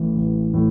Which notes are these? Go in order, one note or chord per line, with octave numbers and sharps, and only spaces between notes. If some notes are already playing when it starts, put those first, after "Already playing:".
Already playing: A1 A2 E3
A1
A2 E3